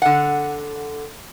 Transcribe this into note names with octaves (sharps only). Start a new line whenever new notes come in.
D3 F#5